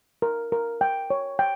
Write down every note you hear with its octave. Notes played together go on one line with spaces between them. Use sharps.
A#4
A#4
G5
C#5
G5